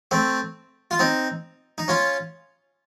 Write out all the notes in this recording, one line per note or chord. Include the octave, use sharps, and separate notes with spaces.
A3 C4
F4
C4 D#4
D#4
C#4 F4